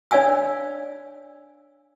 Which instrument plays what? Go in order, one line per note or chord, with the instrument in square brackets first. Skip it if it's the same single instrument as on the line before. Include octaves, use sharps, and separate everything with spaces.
[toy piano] D4 C#5 D5 F5 G#5 E6